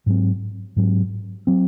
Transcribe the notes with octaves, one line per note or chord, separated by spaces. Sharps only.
G#2 F#3 C4
G#2 F#3 C4
F#3 C4